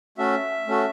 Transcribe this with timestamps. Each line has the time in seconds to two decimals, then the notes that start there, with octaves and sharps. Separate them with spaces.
0.18 A3 C#4 F#4 A4 E5
0.67 A3 C#4 F#4 A4